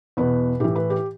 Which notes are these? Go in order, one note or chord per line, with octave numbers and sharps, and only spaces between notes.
E2 B2 B4
A2 E3 G4
B4
G4